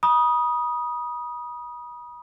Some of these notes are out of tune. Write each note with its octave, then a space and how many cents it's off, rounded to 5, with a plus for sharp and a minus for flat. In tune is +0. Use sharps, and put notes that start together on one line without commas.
B5 -40 D#6 +0